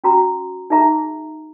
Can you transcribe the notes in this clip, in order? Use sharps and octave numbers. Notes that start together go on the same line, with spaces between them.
C#4 F#4 A#5
D#4 G#4 E5 A#5